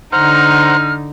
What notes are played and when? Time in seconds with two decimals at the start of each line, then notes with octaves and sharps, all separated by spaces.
0.13 D3 D#4 C5 F#5 A#5 F6